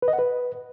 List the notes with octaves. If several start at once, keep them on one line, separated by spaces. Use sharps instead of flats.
B4
D#5
F#5
B4